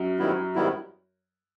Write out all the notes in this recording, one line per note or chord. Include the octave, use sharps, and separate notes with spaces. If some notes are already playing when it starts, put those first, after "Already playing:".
Already playing: F#2 F#3
G#2 D#3 G3 B3 E4
G#2 D#3 G3 B3 E4